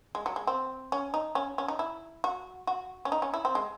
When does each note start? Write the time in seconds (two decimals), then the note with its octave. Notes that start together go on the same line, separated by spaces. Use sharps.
0.15 G#3
0.26 F#3
0.36 G#3
0.47 C4
0.92 C#4
1.14 D#4
1.35 C#4
1.58 C#4
1.68 D#4
1.79 E4
2.24 F#4
2.67 F#4
3.05 C#4
3.12 D#4
3.22 C#4
3.34 E4
3.45 C4
3.55 G#3